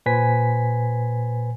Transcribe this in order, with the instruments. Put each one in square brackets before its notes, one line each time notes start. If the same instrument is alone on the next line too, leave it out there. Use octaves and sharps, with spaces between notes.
[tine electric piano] A#2 B4 C5 G#5 B6